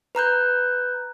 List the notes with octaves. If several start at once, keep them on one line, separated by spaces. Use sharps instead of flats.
B4 A#5 F#6 G6